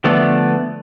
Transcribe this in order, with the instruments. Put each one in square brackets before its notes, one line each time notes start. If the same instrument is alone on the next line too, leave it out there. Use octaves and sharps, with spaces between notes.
[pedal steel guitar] D3 F3 A3 B3 D5